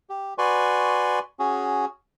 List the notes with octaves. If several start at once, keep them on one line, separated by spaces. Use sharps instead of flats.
G4
F#4 B4 D5 G#5 C6 C#6
C#4 F#4 G#4